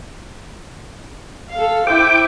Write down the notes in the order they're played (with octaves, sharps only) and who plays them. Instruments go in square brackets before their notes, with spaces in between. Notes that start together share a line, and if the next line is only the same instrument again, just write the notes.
[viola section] A4 F5
[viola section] E4 C5 [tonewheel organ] G5 D6